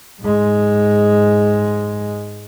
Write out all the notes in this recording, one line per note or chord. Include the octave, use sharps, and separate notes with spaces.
G#2 G#3